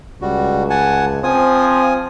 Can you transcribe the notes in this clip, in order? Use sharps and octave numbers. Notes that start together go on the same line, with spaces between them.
C#2 G3 F#4
F#5 G#5 A5
F3 C4 G#5 D#6